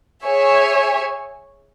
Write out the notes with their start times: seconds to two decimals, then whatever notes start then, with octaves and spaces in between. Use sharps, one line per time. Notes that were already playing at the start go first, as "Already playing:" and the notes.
0.24 G#4 C#5 E5 G#5